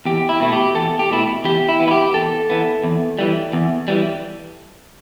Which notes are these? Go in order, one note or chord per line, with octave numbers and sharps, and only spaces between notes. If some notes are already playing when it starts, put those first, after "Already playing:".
E2 G4
E4
B2 A3 E4
G4
E2 A4
G4
B2 A3 E4
E2 G4
E4
E3 B3
E4
G4
E2 A4
E3 B3
E2
E3 G3
E2
E3 G3